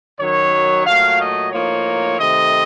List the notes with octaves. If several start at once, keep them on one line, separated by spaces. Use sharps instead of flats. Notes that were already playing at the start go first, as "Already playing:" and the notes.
F#2 D#3 F#3 C#5
A#2 F#3 A3 F5
D#5
A2 F3 A#3 D#4 C#5
C3 D#3 A3 C4 D#5